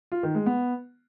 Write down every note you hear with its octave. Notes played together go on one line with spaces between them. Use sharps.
F4
D#3
G#3
B3